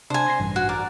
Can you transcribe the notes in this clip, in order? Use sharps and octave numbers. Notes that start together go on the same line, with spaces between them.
C3 D4 C5 G#5
C6 A#6 C7
A1 G2
F#4
A#4 D5